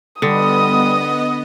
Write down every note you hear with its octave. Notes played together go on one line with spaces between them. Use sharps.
D3 G3 B3 D#5 D#6